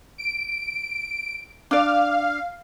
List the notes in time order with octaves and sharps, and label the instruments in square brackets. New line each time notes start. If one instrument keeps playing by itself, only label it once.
[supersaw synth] D7
[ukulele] D4 D5 [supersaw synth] F5